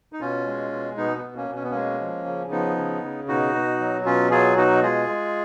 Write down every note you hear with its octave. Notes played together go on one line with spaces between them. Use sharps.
D#4
B2 C#4 F4
G#3
B2
B2 B3 D#4
B3
B2
A#3 C#4
B2
C#4
B3
G#3 A#3 C#4
F3
C#3
F3 B3 D#4
C#3
C#3
B2 D#4 F#4
B2
F#3
B2 C#4 F4
F#3 F4 G#4
B2 D#4 F#4
G#3 F4 G#4
G#3